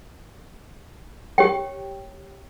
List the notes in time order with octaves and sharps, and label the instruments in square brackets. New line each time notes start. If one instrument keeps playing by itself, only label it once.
[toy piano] G4 C#5 G5